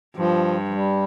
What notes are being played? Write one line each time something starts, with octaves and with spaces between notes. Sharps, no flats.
G2 F3
F3
G3